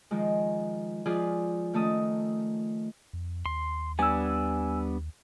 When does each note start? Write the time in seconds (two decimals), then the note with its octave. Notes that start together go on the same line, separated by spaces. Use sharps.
0.11 D#3 F3 G#3
1.06 F3 F4 G#4 B4 D5
1.73 D#3 A3 C#4 A5 D#6
3.13 F2
3.46 D#2 C6
3.99 G3 B3 D4 G#5 E6